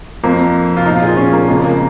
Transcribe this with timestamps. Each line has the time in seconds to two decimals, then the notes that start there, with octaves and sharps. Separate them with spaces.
0.23 F2 F3 A#3
0.77 F4
0.86 A#2 F3 D#4
0.96 F4
1.02 G#4
1.07 F4
1.17 C#4
1.33 A#3
1.48 F2 C#3 F3 G#3
1.64 A#3